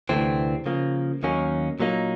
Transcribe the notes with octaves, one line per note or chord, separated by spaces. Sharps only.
D2 C3 E3 A3 C4
C#3 F3 A#3
D#2 D#3 F#3 A#3 C#4
A#2 F#3 A#3 D#4